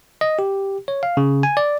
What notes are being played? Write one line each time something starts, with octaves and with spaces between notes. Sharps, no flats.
D#5
G4
C#5
F5
C#3
G#5
D5